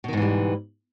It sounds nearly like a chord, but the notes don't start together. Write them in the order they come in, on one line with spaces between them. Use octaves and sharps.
B2 D#3 G#2 E3 G3